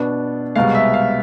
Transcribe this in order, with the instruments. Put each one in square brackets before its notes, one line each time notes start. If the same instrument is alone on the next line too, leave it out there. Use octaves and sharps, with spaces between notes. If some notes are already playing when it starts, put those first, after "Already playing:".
Already playing: [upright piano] B2 B3 D4
C2 B2 G#3 F5
E5
F5